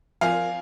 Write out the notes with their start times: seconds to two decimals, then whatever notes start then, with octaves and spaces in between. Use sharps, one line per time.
0.21 F3 C4 F4 A#4 D5 F5 G#5